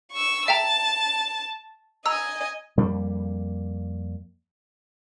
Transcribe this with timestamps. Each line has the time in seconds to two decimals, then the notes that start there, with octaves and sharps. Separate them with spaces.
0.12 C#6 E6
0.48 E5 G5 A5 A#5
2.06 D#5 G#5 A#5 E6
2.77 F2 G3 A#3